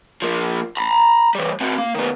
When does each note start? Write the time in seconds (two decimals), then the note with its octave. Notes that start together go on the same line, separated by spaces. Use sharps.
0.22 F3 A#3
0.77 A#5 B5
1.35 E3 G3
1.61 C4 F#4
1.78 A#3
1.95 D#3 B3